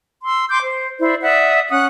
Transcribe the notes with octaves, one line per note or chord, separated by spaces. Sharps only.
C6 E6
C6 D6 G6
C5
E4 C5 D5
D5 E5 F#5 D#6
C#4 F#5 D#6 F#6